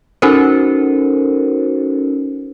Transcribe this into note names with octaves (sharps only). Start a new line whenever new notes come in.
C#4 D#4 F#4 A4 A#4 C5